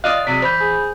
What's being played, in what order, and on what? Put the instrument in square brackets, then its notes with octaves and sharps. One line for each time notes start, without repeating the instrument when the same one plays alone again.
[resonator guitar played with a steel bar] F4 D5 D#5 [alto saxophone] F5 [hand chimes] F#6
[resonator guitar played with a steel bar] C3 F#3 G#3 [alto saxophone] D5 [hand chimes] B6
[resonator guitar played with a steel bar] E3 [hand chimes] C5 B5 G6
[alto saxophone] G#4